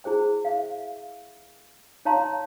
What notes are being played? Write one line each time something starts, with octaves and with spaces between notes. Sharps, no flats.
E4 G#4 C5 G5
E5 F5
D#4 C#5 F5 A5 A#5 C6